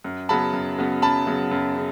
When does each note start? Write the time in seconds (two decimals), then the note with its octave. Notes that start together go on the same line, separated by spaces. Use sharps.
0.04 F#2
0.29 C#3 F#3 B3 A5 B5
0.53 F#2
0.78 C#3 F#3 B3
1.02 F#2 A5 B5
1.27 C#3 F#3 B3
1.51 F#2
1.76 C#3